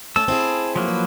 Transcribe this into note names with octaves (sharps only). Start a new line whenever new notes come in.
A3 C#4 A5 E6
C4 E4 G#4
F3 F#3 A#3
B4